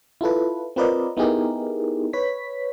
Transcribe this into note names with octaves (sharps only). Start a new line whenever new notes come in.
E4 F4 A4 B4
C4 F4 A#4 B4 D5 D#5
B3 D#4 E4 G4 G#4 A#4
B4 C#5 B6